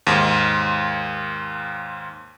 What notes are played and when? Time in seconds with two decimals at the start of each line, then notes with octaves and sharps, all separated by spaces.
0.07 D#2 G#2